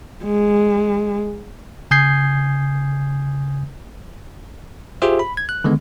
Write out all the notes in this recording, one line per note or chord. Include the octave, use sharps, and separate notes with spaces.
G#3
C#3 G#5 D#6 G6 G#6 C7
F4 G4 G#4 C5 E5
B5
G#6
F#6
D3 D#3 G#3 B3